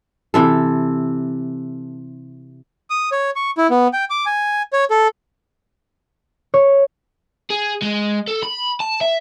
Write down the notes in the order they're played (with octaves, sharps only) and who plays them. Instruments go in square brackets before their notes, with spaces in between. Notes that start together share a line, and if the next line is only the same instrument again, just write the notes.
[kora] C3 E3 A4
[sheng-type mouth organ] D#6
C#5
C#6
E4
B3
G5
D6
G#5
C#5
A4
[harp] C#5
[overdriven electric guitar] G#4
G#3
A4
B5
A5
E5